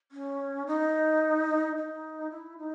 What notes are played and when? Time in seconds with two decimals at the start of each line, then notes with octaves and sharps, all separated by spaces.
0.12 C#4
0.67 D#4
1.77 D#4
2.31 E4
2.58 D#4